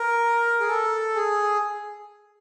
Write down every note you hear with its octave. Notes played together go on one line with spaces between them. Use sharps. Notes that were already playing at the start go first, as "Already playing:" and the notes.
Already playing: A#4
G#4
A4
G#4